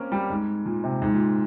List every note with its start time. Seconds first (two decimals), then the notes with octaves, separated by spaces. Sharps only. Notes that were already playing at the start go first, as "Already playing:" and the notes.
Already playing: A#3 C4 C#4
0.12 G3
0.30 G#2
0.65 A#2
0.84 C3
1.02 G#2
1.13 A#2